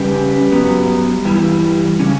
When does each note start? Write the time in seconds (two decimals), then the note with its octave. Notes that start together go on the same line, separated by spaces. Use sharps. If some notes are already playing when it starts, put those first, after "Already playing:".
Already playing: C#3 G3 C#4 G4 B4
0.52 G2 F#3 B3
1.25 G2 E3 G3
2.00 C#3 G3 C#4